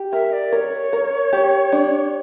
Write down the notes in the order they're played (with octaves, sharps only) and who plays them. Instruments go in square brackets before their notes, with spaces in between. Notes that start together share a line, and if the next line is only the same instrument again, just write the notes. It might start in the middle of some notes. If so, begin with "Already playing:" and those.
Already playing: [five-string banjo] G4
[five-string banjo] A#4 [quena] E5
[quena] D5
[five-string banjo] A#4 [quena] C#5
[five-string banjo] A#4
G4
D4